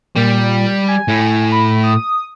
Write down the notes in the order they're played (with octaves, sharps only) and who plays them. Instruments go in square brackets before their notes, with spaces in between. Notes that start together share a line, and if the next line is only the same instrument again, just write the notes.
[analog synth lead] A#2 [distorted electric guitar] G3
[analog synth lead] G#5
[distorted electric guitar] A2
[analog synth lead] B5
D#6